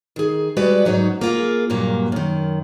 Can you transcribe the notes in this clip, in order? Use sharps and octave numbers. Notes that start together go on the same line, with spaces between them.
D#3 G#4
G3 G#3 F#4 B4 D5
G#2 F#3 C#4 D#4
A#3 F4 G#4
G2 A#2 F#3 A#3
F#2 D#3